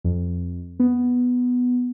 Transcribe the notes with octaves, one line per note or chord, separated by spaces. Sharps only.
F2
B3